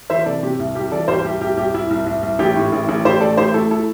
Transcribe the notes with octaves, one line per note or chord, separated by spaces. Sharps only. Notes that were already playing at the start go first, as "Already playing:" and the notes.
E3 C5 E5
C3 A4 D5
C3 G4
C2
C2 G4
E3 A4 D5
C2 G4 C5
C2 G4
C2 G4
C2 G4
C2 E4
C2
C2
C2
A1 G4
A2
A1
A1
A1 G4 C5
A3 A4 D5
A1 G4 C5
A3 E4 A4
E4 A4